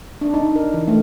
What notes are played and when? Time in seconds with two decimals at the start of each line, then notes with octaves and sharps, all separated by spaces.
0.21 D4
0.34 D#4
0.56 A#4
0.74 E3
0.88 A3